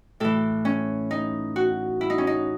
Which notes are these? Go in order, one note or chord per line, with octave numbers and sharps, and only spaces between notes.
A2 E3 A4
C#4
D#4
F#4
E4
D#4
C#4
D#4